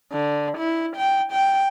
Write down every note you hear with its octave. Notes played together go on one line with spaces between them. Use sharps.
D3
E4
G5
G5